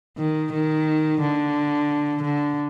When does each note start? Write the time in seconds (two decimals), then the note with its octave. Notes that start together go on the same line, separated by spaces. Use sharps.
0.18 D#3
0.53 D#3
1.21 D3
2.22 D3